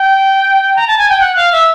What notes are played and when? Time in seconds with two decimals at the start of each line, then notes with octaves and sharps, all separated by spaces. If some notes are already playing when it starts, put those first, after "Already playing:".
Already playing: G5
0.76 A#5
0.87 A5
0.98 G#5
1.09 G5
1.20 F#5
1.36 F5
1.52 E5